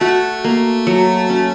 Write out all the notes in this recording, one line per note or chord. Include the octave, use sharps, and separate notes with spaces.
A3 F#4
A#3
F#3
C#4